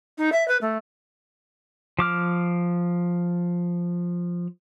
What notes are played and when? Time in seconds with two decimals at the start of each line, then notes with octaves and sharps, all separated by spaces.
0.18 D#4
0.32 E5
0.48 B4
0.61 A3
1.99 F3 D6 F6